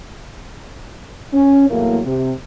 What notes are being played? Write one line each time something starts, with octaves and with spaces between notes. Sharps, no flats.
C#4
E2 A2 F#3 A#3
C3